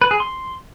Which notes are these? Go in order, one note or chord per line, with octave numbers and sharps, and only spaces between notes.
B4
G#4
C6